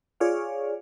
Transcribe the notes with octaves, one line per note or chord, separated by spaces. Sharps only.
F4 G#4 C#5 D5 F5